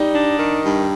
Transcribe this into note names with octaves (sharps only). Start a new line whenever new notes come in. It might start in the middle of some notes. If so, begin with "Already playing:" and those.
Already playing: G3 D#4
D4
D#3
G2